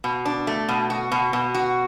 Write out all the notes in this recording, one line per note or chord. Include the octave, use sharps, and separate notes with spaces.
B2
D4
A3
B2
F#4
B2
B2
F#4